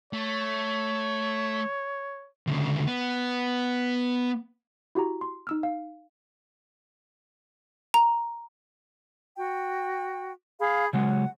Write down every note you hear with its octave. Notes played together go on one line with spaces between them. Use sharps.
A3 C#5
D2 C#3
B3
E4 F#4 G4 A#5
C6
D#4 E6 F6
F5
A#5
F#4 G5
G#4 F5 B5
C#3 F#3 G#3 F#5